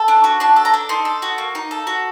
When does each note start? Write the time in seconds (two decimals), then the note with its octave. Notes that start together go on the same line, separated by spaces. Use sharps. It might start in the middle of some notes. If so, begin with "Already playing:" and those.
Already playing: A4
0.08 D4
0.24 F#4
0.40 D4 A5
0.56 A4
0.65 A#5
0.74 D4
0.89 D#4 C6
1.05 A4
1.22 F#4
1.38 A#3
1.55 D#4
1.71 A4
1.87 F#4